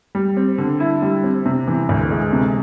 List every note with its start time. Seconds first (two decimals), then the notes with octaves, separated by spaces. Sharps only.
0.15 G3
0.37 C4
0.58 D3
0.80 E4
1.02 G3
1.23 C4
1.46 C3
1.67 E3
1.89 D2
2.11 G#3
2.33 C3